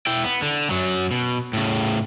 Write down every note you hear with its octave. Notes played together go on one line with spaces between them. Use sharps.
E4 G5
B3
D3
F#2 F#3
B2
A2 C#3